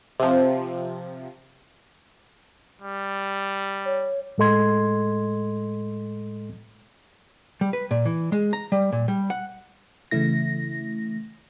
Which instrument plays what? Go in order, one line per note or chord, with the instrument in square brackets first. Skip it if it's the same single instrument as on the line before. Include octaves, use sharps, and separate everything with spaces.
[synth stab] C3 F3
[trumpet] G3
[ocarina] C#5
[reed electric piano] A2 G#3 A4 D#5 C6 G#6
[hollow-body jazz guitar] G3
B4
A#2
E3
G#3
A#5
G3
A#2
G3
F#5
[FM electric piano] C#3 E3 A3 E4 A#6